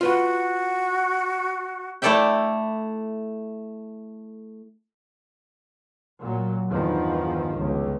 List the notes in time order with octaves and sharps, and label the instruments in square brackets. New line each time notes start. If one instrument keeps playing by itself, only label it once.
[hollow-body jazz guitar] F4 B4 F#5 [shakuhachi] F#4
[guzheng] A3 E4 A4 D5 E5 G5
[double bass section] A#2 F#3
E2 G2 D#3 F3
G1 C#2